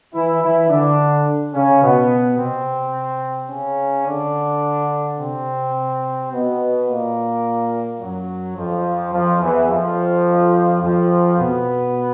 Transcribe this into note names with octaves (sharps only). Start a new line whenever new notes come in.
E3 E4
E3 E4
D3 D4
C#3 C#4
B2 B3
C3 C4
C#3 C#4
D3 D4
C3 C4
B2 B3
A#2 A#3
F#2 F#3
F2 F3
F2 F3
E2 E3
F2 F3
F2 F3
B2 B3